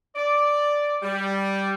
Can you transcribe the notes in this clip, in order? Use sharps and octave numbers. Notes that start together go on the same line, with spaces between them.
D5
G3